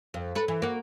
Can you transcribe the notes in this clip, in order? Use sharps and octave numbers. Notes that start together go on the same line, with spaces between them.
F2
A4 B4
E3
A#3 F#4